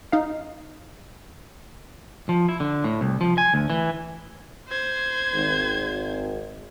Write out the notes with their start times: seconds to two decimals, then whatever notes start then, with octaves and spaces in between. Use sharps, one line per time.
0.12 D#4 F5
2.29 F3
2.49 E4
2.60 D3
2.84 A2
3.01 C2
3.21 F3
3.38 G#5
3.54 D2
3.70 E3
4.69 C5 G#6
5.33 G#1